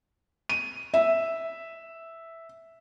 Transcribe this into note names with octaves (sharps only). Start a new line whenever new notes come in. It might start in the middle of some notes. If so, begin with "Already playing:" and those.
D#7
E5